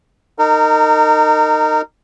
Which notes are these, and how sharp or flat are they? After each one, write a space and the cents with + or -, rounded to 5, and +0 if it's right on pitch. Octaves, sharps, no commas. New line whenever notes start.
D#4 -15 A#4 -30